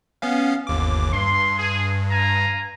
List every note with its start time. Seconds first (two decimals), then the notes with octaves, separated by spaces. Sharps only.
0.22 B3 C#4 F5
0.67 G1 D#2 D6
1.13 G2 C6
1.59 G#4
2.11 F5 G#5 A#5